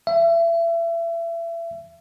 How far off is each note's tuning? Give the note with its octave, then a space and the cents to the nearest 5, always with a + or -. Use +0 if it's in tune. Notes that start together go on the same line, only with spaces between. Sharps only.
E5 +30